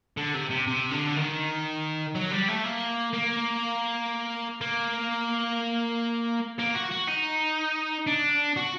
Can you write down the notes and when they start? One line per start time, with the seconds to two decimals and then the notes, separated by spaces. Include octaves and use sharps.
0.17 D3
0.34 C3
0.50 C3
0.67 C3
0.91 D3
1.16 D#3
2.15 F#3
2.31 G3
2.48 A3
2.64 A#3
3.13 A#3
4.61 A#3
6.59 A#3
6.75 F#4
6.91 F#4
7.08 D#4
8.07 D4
8.57 F#4